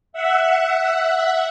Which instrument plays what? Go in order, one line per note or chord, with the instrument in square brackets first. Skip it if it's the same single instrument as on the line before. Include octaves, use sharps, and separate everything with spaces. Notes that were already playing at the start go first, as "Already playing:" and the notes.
[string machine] E5 F#5